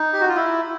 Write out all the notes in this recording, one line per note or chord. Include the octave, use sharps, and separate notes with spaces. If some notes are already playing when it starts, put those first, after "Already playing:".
Already playing: D#4
G4
F#4
F4
E4